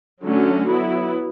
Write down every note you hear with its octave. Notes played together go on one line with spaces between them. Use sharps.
D3 F#3 A3 C#4 F#4
F#3 B3 E4